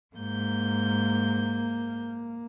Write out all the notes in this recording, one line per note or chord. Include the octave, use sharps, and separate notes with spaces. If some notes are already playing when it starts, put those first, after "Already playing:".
G#2 A#3 G6